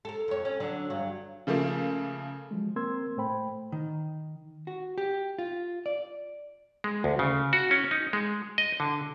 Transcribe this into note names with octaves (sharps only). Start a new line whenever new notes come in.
A4 A#4
F2 C#5
C#4
D3 F#3 D4
G2 F#3
C#3 F3 A3 A#3
F3 F#3 G#3
A#3 C4 A#4 C6 E6 G#6
A2 A3 C5 G5 B5
D#3
F#4
G4
F4
D5
G#3
D2
C#3
F#4
C#4
D#4
G#3
D#5
D3